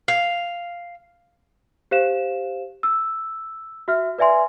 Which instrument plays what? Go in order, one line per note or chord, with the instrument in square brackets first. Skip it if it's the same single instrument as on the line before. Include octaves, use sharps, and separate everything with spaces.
[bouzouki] F5
[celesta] G4 C5 F5 E7
E6
F#4 E5 F6
B4 D5 E5 G#5 C6